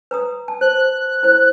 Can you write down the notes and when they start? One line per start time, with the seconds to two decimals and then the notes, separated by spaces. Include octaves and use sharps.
0.11 B4 A#5 D#6
0.48 A5
0.61 C5 F#6
1.23 E4 C5